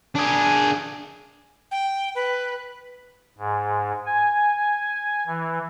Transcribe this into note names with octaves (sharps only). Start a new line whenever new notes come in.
D4 G#4
G5
B4
G#2
G#5
E3